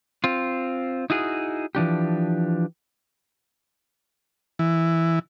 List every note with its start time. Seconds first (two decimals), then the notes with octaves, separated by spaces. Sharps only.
0.24 C4 F4
1.10 D#4 E4 F#4 G#4
1.75 E3 F3 D4 G4
4.59 E3